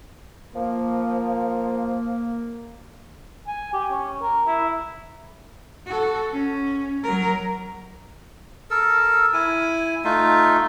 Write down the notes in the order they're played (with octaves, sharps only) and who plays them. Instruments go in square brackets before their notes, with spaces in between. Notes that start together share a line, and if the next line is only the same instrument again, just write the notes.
[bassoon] F3 [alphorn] A#3
[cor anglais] G#5
G4
C#4
A#4
E4
[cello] F#4 A4
C#4
F#3 A#4
[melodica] A4 A#4 E6
E4 G#5
A3 D#4 F4